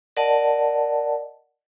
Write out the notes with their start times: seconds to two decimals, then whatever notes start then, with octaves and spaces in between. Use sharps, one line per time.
0.17 A#4 D5 D#5 F#5 A5